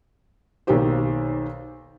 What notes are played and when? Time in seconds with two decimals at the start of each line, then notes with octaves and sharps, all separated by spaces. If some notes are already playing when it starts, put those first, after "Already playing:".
0.67 B1 D#3 A#3 G4 C5